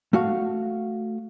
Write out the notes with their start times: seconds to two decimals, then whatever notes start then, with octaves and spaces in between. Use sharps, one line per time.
0.13 A3 F#4 F5